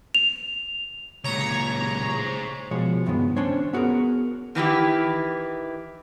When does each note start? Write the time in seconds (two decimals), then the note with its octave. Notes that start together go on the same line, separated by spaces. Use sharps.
0.15 F7
1.24 C#2 A#2 C#5 A#5
2.15 G#4 C5
2.71 B2 F3 G#3 C#5
3.06 C#2 G2 D#3 G#3 B3
3.37 C#4 D4 C5 C#5
3.73 B3 F#4 G#4 A#4
4.55 D#3 E3 E4 G4